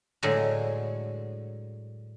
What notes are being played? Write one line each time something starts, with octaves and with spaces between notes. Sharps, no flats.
A2 D3 F#3 G#3